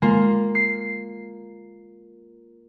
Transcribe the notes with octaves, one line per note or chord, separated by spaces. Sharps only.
G#3 A#3 F4
C7